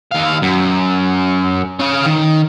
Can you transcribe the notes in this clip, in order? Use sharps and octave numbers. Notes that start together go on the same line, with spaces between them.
D#2 F5
F#2
C#4 F5
D#3